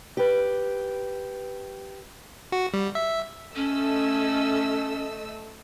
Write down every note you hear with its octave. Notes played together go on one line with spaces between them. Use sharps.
G4 B4
F#4
G3
E5
A3 C#4 D#5 E6